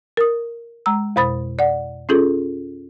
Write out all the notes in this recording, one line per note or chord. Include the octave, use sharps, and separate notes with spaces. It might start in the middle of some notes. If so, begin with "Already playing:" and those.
A#4 D#6
G#3 A#5 E6
F2 B2 C5 B5 D#6 A6
D5 F#5
C#4 F4 G#4 A4